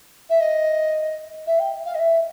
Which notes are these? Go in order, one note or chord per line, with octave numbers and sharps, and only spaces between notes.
E5
D#5
E5
G5
F5
D#5
E5